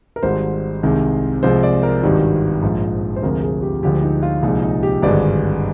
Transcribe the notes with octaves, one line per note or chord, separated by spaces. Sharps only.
A#4
G#1 G#2 G3 C5
C2 C3 D#3 G#3
C2 C3 F3 G#3 C5
D5
A#4
G#1 G2 D#3 G3
A#1 G#2 F3
C5
D2 C3 F3 G#3 A#4
G#4
G4
D2 D3 F3 G#3 G4
D#4
F4
C2 A#2 F3 G#3 D#4
D#4
G4
G#1 G2 D3 G#3 D5